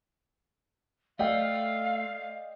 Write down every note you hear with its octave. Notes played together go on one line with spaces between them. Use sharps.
A3 D5 D#5 F5 G5